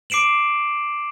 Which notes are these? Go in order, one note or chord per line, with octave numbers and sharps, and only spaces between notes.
D6 C7 D7 E7 F#7